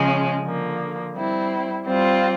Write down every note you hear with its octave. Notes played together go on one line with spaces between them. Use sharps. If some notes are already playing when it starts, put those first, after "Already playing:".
Already playing: C#3 F3 G#3 C#4
D3 F3 A#3
G3 C4 E4
G3 C4 F4